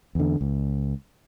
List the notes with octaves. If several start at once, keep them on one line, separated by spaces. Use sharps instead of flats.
E2 D3
C#2